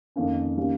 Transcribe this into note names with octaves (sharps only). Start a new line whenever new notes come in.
F2 D#3 A#3 C#4
D#3 G3 A#3 C#4